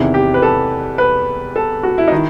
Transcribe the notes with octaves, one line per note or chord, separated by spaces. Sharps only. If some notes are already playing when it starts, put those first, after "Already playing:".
Already playing: E2 C3 D#3 E4
G4
B4
A4
B4
A4
F#4
E4
D#4
D#3 E4